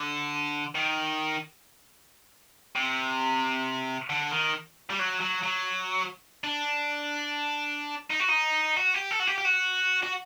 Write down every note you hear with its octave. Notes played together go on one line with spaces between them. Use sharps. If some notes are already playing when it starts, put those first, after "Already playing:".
Already playing: D3
D#3
C3
D3
D#3
G3
F#3
F#3
F#3
D4
D#4
F#4
D#4
F#4
G4
A4
F#4
G4
G4
F#4
F#4